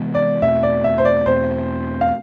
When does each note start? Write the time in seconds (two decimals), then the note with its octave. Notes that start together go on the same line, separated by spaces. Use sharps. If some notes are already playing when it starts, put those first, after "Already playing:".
Already playing: C3 E3 G#3 B3
0.15 D5
0.42 E2 B2 A3 C4 E5
0.63 D5
0.84 E5
0.98 C5
1.05 D5
1.26 E2 B2 A3 C4 C5
2.01 F5